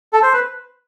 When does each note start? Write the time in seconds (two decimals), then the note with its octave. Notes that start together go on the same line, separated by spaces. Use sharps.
0.13 A4
0.22 C5
0.33 B4